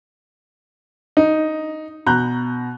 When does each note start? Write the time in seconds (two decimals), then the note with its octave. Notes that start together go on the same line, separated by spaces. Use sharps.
1.17 D#4
2.06 B2 A#5 F#6 G6